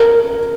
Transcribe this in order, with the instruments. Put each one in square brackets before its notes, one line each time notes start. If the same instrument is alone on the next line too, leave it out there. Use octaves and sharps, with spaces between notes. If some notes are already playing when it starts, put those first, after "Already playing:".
Already playing: [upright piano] A#4